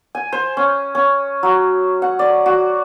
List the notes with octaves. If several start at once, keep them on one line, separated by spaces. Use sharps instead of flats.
G#5
C5
C#4
C#4
F#3
F#5
D5
F#4